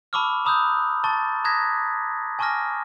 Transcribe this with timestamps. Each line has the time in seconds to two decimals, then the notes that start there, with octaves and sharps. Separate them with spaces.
0.13 A5 B5 C#6 D6 E6 F6
0.45 A#5 B5 D#6 E6 F#6 G6
1.04 A5 C#6 A6
1.44 A#5 D#6 F#6 G#6 A#6 B6
2.39 G#5 A5 C#6 D6 F6 A#6